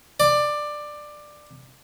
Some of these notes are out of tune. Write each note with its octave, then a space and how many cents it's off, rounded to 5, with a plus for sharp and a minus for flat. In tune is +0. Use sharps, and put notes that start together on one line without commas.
D5 +15